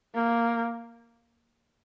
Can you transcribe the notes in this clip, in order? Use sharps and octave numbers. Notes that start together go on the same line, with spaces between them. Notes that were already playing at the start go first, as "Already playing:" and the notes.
A#3